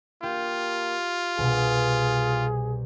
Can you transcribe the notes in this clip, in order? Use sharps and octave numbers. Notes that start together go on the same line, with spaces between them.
A#3 F4 G4
C2 B2 G#4